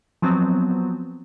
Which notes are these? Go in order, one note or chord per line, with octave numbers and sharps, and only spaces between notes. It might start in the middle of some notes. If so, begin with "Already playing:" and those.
F3 F#3 B3 C4